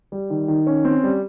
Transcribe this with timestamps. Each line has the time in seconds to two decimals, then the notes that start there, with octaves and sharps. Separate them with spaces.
0.12 G3
0.30 D#3
0.48 D#3
0.67 C#4
0.85 C4
1.04 G3